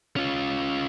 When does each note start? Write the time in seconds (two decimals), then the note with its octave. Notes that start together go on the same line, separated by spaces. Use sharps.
0.16 C#4 F4